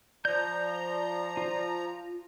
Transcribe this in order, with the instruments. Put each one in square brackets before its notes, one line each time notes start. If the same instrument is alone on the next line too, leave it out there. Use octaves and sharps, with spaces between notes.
[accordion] F3 A#5 [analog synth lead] D5 [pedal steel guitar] G6
[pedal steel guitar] F4